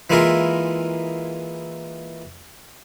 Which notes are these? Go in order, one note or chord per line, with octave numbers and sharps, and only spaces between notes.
E3 G#3 A#3 E4 F4 A#4